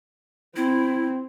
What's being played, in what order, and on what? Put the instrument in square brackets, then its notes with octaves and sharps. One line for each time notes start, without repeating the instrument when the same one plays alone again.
[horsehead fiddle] C4 [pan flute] E4